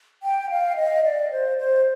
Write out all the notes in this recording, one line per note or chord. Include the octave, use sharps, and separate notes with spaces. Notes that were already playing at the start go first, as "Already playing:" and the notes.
G5
F5
D#5
D5
C5
C5